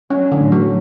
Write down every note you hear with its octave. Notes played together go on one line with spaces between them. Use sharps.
F#3 C#4
D3
A2
F#3